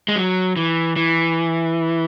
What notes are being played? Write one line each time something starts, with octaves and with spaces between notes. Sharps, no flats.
G#3
F#3
E3
E3